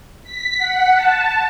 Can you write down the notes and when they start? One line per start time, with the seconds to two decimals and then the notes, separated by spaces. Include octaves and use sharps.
0.23 B6
0.57 F#5
0.95 A5